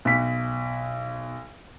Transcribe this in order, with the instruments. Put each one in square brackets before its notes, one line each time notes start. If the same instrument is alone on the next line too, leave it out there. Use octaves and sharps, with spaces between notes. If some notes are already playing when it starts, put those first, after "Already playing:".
[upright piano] B1 B6